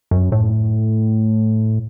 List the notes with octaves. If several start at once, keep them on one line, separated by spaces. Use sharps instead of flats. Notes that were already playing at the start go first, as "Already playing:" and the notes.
F#2
A2